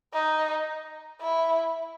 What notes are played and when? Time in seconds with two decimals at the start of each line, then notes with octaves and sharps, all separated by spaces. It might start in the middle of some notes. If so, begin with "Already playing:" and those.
0.13 D#4
1.21 E4